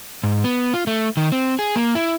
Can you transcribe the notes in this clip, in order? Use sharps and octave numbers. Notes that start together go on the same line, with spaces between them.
G#2
B3
F4
A3
D#3
C4
G#4
A#3
E4